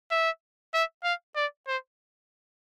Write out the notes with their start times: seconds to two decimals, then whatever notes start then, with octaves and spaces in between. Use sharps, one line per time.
0.11 E5
0.74 E5
1.04 F5
1.36 D5
1.67 C5